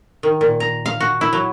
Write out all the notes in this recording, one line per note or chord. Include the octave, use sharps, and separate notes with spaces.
D#3
A#2
A#5
F5
F#4
E4
F#3